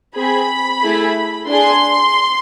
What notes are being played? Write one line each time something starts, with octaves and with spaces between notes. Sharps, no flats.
C4 G#4 B5
A3 E4 G#4
D4 G#4 C6